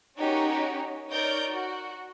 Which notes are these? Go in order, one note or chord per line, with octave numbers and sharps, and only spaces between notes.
C#4 D#4 F#4 G4 A#4 C#5
D#4 A#4 C#5 D5 G6 D7
F#4